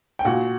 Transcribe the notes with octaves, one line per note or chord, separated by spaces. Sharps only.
G5
A#2 F#4 F#5